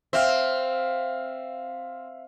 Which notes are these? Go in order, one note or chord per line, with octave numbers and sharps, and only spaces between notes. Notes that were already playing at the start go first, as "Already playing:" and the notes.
C4 E5 F5 F6